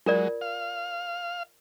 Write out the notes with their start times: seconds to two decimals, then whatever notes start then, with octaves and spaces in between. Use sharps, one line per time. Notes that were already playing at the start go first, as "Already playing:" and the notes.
0.06 F#3 G#3 F4 A#4 D5
0.41 F5